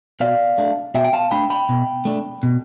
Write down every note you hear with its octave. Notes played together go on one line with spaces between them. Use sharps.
B2 D5 F5
A3 D4
B2 E5 G5
G5
F5 A5
A3 D4 G5 B5
G5 B5
B2
A3 D4
B2